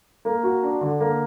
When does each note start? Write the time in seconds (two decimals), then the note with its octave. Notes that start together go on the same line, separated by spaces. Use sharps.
0.25 A#3
0.43 F#4
0.63 D4
0.81 D3
1.00 A#3